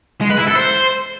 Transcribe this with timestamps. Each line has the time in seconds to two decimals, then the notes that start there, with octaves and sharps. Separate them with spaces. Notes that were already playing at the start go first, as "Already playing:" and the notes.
0.21 G#3
0.30 B4
0.39 E4
0.47 A4
0.56 C5